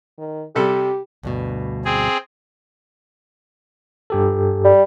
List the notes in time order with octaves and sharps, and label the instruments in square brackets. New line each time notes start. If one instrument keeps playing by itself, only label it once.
[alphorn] D#3
[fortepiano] C3 G3 A4 [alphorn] G4
[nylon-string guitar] D2 G2 B2
[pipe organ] C4 G#4
[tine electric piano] G2 G4 A4
[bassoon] G3